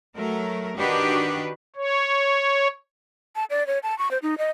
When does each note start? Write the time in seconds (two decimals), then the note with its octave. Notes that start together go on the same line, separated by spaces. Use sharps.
0.16 F#3 A3 A#4
0.78 D#3 D4 F#4 G4 B4
1.76 C#5
3.36 A5
3.50 D5
3.67 C#5
3.83 A5
3.99 C#6
4.11 C5
4.22 D#4
4.38 D#5